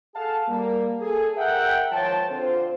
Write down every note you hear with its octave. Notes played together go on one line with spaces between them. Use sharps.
G#4 A4 F5 F#5 A5
G3 A#3
G#4 A4
A#4 E5 F#5 G5
G#2 D#3 F3 C#5 G5 A5
D3 C4 F4 C5